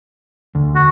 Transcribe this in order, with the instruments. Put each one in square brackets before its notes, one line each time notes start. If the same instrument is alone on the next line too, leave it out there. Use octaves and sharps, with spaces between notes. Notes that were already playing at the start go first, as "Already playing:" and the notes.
[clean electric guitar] D2
[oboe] F#4